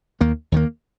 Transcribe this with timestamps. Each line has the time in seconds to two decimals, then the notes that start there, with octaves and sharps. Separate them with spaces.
0.20 D#2 D#3 A#3
0.52 D#2 D#3 A#3